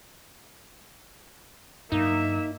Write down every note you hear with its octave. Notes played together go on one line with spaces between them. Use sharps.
G2 F#3 A#3 D4 D#4 E5